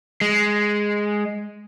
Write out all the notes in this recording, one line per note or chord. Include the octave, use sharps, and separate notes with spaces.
G#3